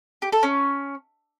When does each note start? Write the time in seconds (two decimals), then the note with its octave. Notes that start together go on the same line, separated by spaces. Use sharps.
0.22 G4
0.32 A4
0.43 C#4